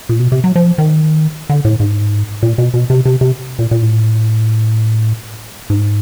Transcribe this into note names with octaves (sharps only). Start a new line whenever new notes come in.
A#2
B2
C3
F#3
F3
D#3
D3
A2
G#2
A#2
B2
B2
C3
C3
C3
A#2
A#2
A2
G#2